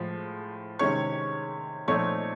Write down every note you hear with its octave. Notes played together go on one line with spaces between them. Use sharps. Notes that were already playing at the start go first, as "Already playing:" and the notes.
Already playing: A2 F3 G#3
C3 D#3 G#3 C#4 C#5 C#6
A#2 F3 A3 C4 D#4 C#5 C#6